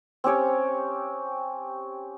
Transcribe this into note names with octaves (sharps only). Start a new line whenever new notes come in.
C4 C#4 G4 C#5